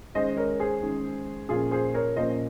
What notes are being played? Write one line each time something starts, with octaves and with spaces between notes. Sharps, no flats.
D#3 G#3 C#4 C5 D#5
A#4 C#5
G#4 C5
D#3 G#3 C#4
A#2 F3 A#3 C#4 F4 G#4
G#4 C5
A#4 C#5
A#2 F3 A#3 C#4 C5 D#5